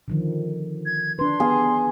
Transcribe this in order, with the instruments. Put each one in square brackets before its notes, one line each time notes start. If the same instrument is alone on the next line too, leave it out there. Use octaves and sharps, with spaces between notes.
[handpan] D3 D#3 F3
[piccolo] G#6
[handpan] D4 B4 [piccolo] C6
[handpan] B3 F5 [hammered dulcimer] G#4